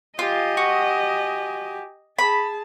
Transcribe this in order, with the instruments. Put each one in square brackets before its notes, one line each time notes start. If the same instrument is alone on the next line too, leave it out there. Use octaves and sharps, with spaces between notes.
[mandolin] F4 [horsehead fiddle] G4 G#5 [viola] D#5
[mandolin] F#4
[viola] G#4 A5 [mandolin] B5